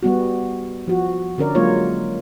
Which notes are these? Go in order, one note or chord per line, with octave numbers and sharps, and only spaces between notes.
G3 B3 F#4
F3 F#4
D3 C#4 A#4 D5
F#3 G#3 A#3 F4 C#5